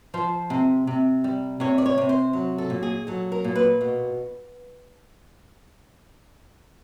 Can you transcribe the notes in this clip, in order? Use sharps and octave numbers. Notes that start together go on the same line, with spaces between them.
F3 C5
C3
C3
G3
C3 C#5
D5
C#5
C3
C5
F#3
A4
A#2
G#4
F#3 A4
A#4
A#2
B4
B2